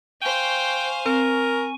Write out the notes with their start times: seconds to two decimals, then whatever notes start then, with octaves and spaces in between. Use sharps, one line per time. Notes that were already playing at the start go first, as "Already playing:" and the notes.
0.22 C5 F5 G5 G#5 C#6
1.06 C4 A#4